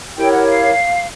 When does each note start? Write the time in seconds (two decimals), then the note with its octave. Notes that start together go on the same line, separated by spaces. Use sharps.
0.17 E4 G4 A#4 C#5 G5
0.33 F#5
0.46 F5